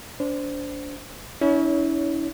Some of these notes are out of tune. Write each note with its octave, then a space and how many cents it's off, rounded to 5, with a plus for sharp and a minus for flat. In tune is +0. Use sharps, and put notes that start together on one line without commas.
D4 -25 C5 -20
C#4 +35 E4 -30 C#5 +25